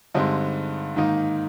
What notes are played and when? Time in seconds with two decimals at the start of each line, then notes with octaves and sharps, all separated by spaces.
0.15 G2 D3 G#3 C4 D#4
0.96 G#2 D#3 A#3 D#4